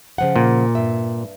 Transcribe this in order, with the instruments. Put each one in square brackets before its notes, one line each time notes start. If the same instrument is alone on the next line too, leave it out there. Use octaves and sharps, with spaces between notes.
[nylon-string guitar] C#3 F3 F#5
[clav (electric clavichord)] A#2
[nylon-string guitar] G2 E5